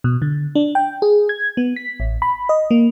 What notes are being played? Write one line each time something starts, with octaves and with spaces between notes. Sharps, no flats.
B2
D3
D4
G5
G#4
G#6
B3
B6
A1
B5
D#5
A#3